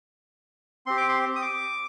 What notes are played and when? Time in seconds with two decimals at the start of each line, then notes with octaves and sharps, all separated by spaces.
0.86 C4 G4 C6
0.97 D6
1.09 C6
1.36 D#6
1.42 D6